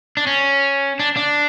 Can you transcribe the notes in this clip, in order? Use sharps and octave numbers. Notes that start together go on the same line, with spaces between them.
D4
C#4
D4
D4